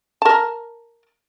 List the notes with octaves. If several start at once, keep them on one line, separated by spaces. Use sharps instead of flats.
A#4 A5